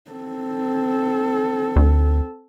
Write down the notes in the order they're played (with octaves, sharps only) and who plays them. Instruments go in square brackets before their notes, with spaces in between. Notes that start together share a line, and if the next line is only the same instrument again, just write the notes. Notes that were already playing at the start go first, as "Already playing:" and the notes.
[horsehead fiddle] C4 A4
[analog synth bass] D2